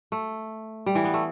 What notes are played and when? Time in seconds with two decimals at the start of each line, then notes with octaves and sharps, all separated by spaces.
0.12 A3
0.86 G3
0.95 E3
1.04 B3
1.14 A3